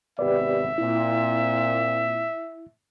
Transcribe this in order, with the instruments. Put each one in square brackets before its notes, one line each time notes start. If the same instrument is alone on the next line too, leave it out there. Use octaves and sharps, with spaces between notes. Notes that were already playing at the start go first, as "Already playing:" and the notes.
[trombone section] G#1 C3 B3 [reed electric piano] G4 B4 D5 [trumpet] E5
[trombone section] A#2 C4 [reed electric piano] E4